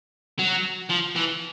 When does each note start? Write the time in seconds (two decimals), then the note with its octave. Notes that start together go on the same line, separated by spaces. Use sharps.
0.39 F#3
0.90 F3
1.16 E3